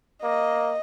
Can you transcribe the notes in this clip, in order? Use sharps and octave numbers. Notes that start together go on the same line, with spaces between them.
A#3 D#5